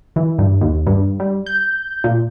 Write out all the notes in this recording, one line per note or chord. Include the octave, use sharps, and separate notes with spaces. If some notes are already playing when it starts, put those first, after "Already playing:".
E3
G2
D#2
G2
G3
G6
A#2